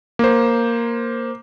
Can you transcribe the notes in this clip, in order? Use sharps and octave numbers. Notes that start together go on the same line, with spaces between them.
A#3 C5